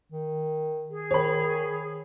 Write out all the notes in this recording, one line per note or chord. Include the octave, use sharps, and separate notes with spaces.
D#3
G#4
D#3 C#5 B5